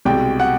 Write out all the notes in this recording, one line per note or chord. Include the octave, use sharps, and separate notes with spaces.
C2 B2 G#3 G5
F#5